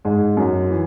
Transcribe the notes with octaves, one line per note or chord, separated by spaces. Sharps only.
G#2 G#3
F#2 F#3
E3